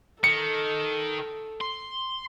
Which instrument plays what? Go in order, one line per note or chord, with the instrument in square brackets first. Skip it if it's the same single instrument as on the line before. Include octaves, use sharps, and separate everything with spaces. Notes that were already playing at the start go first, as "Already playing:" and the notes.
[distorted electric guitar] D#3 [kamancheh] A4 [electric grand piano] C#7
[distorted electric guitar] C6